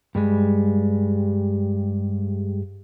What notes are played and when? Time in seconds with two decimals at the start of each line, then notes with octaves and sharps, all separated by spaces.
0.15 G2 G3 G#3